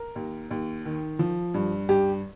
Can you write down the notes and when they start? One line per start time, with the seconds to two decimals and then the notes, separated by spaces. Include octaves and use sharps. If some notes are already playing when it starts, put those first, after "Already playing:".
Already playing: A#4
0.16 D#2
0.51 D#2
0.85 D#3
1.19 F3
1.54 G2
1.89 G2 G4